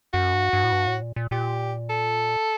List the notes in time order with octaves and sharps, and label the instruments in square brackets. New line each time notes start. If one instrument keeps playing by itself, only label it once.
[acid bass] F#2 [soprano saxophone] F#4
[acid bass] G2
G2
A2
G2
A2
A#2
A#2
[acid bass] A#2 [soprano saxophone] G4
[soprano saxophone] A4